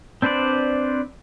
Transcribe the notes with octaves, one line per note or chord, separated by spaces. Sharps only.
C4 D4 B4 C5 D5